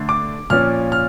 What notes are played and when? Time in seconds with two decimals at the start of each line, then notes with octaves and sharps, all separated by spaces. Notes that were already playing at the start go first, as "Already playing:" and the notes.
Already playing: D3 A3 D4
0.09 D6
0.50 A#2 F3 C#4 F6
0.92 F6